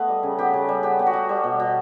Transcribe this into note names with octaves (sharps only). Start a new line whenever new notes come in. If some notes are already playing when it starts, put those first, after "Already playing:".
Already playing: A3 B3 B4 D#5
G3
C#3
B3 G4
C#3
G3
B3 G4
B3
F#4
G3
G3
B2
B2